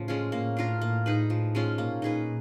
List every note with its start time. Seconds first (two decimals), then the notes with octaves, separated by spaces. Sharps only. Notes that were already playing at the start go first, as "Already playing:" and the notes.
Already playing: A2 C#3 F3
0.08 G#3 C#4 F4
0.32 A2 A#3
0.57 D4 F4 A#4
0.82 A#3
1.06 D#4 G#4 B4
1.30 F3
1.55 G#3 C#4 F4
1.78 A#2 A#3
2.02 D#4 G#4 B4